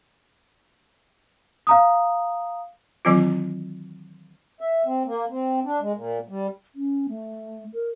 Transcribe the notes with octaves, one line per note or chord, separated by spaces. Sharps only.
F5 A#5 D#6
D#3 E3 F#3 C4 E4 F4
E5
C4
A#3
C4
D4
G#3
A#2
G3
C#4
A3
A#4